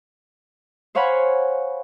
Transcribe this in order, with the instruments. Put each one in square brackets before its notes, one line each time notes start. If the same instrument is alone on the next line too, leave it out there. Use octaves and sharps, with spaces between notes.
[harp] C5 C#5 F5 F#5 G#5 B5